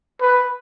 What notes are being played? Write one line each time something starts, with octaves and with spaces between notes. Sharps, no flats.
B4